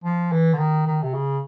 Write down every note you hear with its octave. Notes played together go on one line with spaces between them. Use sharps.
F3
E3
D3
D#3
D#3
C3
C#3